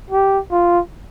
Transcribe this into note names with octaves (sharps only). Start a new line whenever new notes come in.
G4
F4